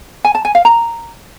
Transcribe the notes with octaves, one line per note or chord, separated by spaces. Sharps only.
G#5
A5
G#5
F5
A#5